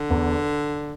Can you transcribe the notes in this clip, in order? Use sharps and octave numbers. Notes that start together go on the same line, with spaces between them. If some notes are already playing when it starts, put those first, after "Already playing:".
Already playing: D3
E2